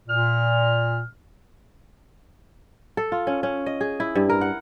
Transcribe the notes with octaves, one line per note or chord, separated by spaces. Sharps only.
A#2 F6
A4
F4
C#4
C#4
D#5
G#4
E4
G2
A#4
F#5